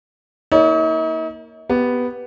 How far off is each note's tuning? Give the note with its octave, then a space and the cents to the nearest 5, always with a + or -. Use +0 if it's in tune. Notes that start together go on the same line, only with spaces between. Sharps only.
A#3 +0 D#4 +45 C#5 +30
B3 +0 G4 +0